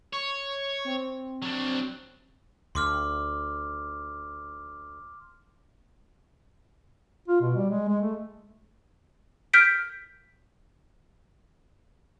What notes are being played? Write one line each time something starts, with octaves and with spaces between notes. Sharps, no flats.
C#5 C#6
C4
F#3 D4
D2 C6 D6 F6
F4
B2
G3
G#3
G#3
A3
F6 G6 B6 D7